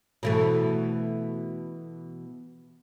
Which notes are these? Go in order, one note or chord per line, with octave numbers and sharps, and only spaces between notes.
B2 E3 A3